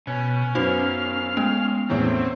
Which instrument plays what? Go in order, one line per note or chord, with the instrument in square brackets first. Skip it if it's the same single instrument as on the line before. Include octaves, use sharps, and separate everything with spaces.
[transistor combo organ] B2 [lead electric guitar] C#4
[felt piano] F#2 B3 [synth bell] D#4 F#4 C5 [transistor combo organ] F5
[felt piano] G#3 [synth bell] B3
[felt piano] E2 A2 C#4 [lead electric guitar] C4